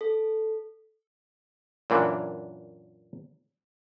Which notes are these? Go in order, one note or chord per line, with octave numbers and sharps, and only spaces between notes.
A4
F#2 A#2 E3 D4